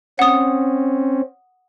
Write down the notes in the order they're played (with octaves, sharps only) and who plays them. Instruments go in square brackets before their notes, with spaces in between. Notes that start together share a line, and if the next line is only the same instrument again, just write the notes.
[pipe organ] C4 C#4 [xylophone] F#5 D#6